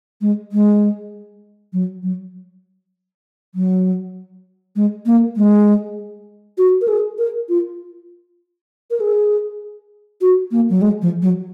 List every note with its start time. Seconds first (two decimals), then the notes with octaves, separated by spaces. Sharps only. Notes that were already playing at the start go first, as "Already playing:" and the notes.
0.21 G#3
0.52 G#3
1.73 F#3
2.03 F#3
3.55 F#3
4.76 G#3
5.06 A#3
5.37 G#3
6.58 F#4
6.81 A#4
6.88 G#4
7.18 A#4
7.49 F4
8.91 A#4
9.00 G#4
10.21 F#4
10.51 A#3
10.70 F#3
10.82 G#3
11.02 F3
11.22 F#3